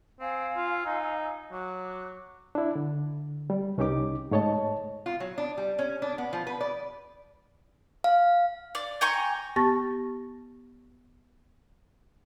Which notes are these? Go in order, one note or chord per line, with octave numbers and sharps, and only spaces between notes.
C4 F5 G#5 E6
F4
D#4
F#3 D6 F#6
D4 E4
D3
G3
C2 C#4 D#4 G4 D6
G#2 A3 C#5 D#5 A5
F4
F#3
D4
G3
C#4
D4
B3
F3
B4
D5
F5
D5
G5 G#5 A#5 C#6
B3 G4 A5 C#6 A6 A#6